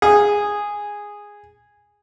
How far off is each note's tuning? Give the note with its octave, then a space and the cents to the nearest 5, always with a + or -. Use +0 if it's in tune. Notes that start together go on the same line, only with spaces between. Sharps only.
G#4 -10